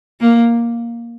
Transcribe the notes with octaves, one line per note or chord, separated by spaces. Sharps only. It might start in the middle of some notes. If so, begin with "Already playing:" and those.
A#3